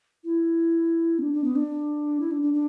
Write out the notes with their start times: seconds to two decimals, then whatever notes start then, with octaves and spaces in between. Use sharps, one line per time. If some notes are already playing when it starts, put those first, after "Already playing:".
0.24 E4
1.18 B3
1.22 D4
1.33 D4
1.44 B3
1.55 D4
2.20 E4
2.31 D4
2.42 D4
2.53 D4